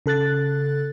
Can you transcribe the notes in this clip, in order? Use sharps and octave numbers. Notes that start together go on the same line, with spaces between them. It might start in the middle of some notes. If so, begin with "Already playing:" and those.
C#3 A4 F#6 A6